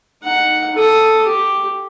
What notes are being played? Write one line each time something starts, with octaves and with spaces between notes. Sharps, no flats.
D#4 F#5
A4 D#6
G4